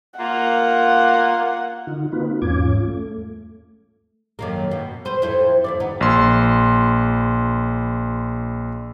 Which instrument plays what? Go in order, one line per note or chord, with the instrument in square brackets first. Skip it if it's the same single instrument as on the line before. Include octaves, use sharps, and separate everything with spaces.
[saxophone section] A#3 F4 [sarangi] F#5
[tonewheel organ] D3 D#4 F4
A#3 C4 D#4 F4 F#4 B4
E2 G#2 C#4 F4 D6 G#6
A3
[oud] F#2 D#3 A#3
B2
B4 C5
F2 E4 C5
D#2 E4 D5
B3 D#4
[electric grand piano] A#1 C6